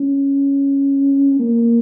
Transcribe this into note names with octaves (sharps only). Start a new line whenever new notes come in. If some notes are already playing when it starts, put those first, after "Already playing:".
Already playing: C#4
A#3